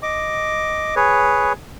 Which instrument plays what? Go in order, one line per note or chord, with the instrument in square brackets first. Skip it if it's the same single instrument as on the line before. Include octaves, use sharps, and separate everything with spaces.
[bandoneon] D#5 D6
G#4 B4 C#5